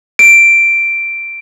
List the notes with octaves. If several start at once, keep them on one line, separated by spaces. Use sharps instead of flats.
D7